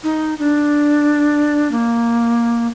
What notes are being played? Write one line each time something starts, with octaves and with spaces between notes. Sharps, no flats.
D#4
D4
A#3